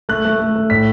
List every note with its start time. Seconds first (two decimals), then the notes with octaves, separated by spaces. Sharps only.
0.09 A3 F#6
0.25 A3
0.39 A3
0.55 A3
0.70 A2 B6